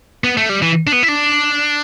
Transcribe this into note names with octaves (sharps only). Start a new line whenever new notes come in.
B3
A3
G3
E3
D4
B3
E4
D4